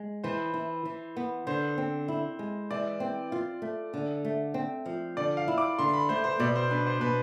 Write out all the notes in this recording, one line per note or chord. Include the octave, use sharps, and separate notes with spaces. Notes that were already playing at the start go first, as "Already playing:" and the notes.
Already playing: G#3
E3 C5
E4
E3
B3
D3 C5
C4
E4
G#3
E3 D5
C4
F4
A3
D3
A3
C4
F3
D3 D5
F5
E4
D6
D3 C6
B5
A3 C5
C5
B2 D5
C5
D4 B4
C5
B2 B4